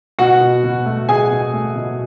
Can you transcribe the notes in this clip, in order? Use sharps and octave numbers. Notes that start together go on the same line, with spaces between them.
B2 F#4 F#5
B2
B2
A3
B2 G#4 G#5
B2
A3
B2